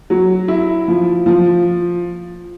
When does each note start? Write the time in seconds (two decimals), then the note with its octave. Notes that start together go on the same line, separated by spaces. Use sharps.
0.10 F#3
0.48 E4
0.88 F3
1.26 F3